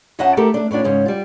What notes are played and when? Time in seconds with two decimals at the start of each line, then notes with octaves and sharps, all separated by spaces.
0.19 F2 C#4 D#5 E5 F#5 A5
0.37 A3 E4 G4 A4 A#4
0.54 A3 D4
0.71 A2 C#4 D4 F4
0.84 G#2 C#3 C#4
1.06 G3 F4